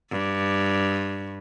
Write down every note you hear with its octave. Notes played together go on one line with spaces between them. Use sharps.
G2